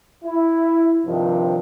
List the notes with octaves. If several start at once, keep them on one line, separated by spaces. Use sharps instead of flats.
E4
G2 C3 D#3 F3